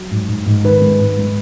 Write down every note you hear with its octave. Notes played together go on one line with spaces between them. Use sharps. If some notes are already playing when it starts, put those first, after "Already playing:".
Already playing: F#3
G#2
G#2
G#2
D#3 B4
G#3
G#2
G#3